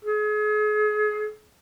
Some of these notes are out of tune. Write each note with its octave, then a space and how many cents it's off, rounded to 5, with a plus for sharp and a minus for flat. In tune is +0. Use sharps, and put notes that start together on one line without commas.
G#4 +35